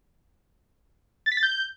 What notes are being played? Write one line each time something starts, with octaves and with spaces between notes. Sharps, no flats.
A6
B6
A6
G6